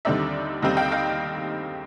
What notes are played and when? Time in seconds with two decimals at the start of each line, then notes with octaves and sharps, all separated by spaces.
0.05 D#2 D3 G3 C4 D#4 D5 E5
0.62 D#2 D3 G3 C4 D#4 D#5 F5
0.77 F5 G5
0.91 D#5 F5